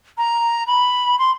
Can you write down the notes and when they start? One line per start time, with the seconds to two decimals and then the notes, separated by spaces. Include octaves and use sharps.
0.18 A#5
0.67 B5
1.19 C6